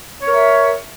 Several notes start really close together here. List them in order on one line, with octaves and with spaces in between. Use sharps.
C#5 A#4 E5